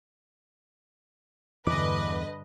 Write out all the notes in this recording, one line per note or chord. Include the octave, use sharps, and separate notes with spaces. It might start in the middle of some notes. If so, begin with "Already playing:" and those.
E2 G2 D3 E3 B4 D#5 D6